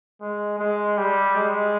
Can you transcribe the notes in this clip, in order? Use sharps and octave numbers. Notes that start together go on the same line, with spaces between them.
G#3
G#3
G3
G#3